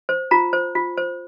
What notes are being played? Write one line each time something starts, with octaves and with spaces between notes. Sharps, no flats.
C5
F4 A#5
C5
F4
C5